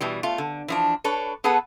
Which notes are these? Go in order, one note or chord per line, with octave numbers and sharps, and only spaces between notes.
B2 E3 G3
A3 F4
D3
E3 F3 D4
D4 A4 B4 C#5
B3 G#4 A4 B4 F#5 A5